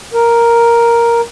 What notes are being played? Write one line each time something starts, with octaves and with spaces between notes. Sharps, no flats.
A#4